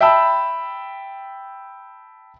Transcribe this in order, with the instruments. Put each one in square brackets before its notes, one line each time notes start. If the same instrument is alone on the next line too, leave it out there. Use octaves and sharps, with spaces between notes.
[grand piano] E5 G5 A5 B5 E6